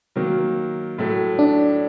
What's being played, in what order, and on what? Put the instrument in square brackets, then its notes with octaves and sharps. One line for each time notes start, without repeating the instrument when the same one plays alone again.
[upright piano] D#3 F#3 A#3
A2 F#3 A3
[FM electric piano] D4